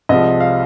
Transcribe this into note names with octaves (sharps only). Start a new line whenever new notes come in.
C2 C3 F3 G#3 D#5
F5